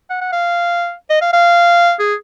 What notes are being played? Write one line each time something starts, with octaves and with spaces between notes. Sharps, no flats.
F#5
F#5
F5
D#5
F5
F5
G#4